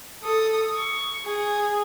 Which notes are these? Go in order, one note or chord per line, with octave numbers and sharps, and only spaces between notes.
A4 D#6
C#6
G#4